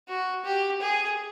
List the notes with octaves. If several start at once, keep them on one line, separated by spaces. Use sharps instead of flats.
F#4
G4
G#4